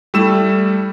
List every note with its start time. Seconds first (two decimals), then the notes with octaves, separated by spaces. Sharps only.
0.14 G3 A3 E4 E6 E7